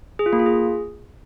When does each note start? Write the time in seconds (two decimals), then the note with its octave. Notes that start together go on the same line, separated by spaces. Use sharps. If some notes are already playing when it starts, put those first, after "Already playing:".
0.19 G#4
0.26 F4
0.33 A#3
0.39 F4
0.46 G#4